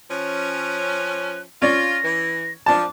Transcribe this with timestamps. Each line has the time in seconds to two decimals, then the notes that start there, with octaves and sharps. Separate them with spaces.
0.11 F3 C#4 F#6
1.62 C#4 F4 D5 A#6
2.04 E3
2.66 F3 D4 A5 D6